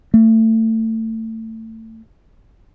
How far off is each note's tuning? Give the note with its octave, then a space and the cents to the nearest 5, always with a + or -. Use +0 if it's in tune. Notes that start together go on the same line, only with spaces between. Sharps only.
A3 +25